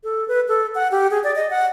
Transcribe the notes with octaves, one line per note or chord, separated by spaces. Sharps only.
A4
B4
A4
F#5
G4
G#4
D5
D#5
F#5